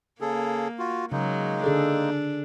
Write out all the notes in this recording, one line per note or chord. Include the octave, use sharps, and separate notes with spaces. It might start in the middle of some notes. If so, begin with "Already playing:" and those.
C#3 A#3 G#4 A4
F4 F#4
C#3 F#3 G#3 A#3 D#4
D3 D4 G#4 A4